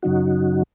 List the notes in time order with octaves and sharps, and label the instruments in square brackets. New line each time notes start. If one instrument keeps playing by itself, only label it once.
[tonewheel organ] F#2 C#3 F#3 D#4 F#4